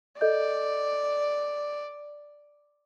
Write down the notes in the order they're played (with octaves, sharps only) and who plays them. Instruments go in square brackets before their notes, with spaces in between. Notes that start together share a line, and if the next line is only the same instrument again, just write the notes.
[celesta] A4 D#5 G6 [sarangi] D5